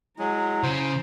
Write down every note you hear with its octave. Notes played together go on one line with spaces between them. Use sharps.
F#3 G#3 E4 A#5
C#3 C5